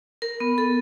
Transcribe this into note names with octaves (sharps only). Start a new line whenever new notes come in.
A#4
B3
A4